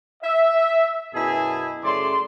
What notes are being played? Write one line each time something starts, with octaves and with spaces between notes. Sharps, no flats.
E5
F#2 B2 E4 G#4 G#5 A5
F#2 C#3 A3 D5 C6